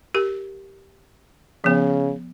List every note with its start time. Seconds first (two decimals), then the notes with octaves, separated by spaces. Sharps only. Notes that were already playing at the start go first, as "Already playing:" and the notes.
0.15 G4 A#4
1.64 C#3 F3 B3